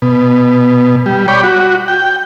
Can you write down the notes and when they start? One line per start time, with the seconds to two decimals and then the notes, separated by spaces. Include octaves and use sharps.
0.02 B2
1.06 G3
1.28 C#5 D5 G5 B5
1.43 F#4
1.88 G5